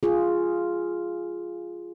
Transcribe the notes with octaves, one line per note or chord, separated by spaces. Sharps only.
F4 G#4